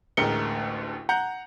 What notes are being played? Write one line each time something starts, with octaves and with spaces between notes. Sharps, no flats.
A1 D2 G#3 A#4 C#7 G7
F#5 A#5 G6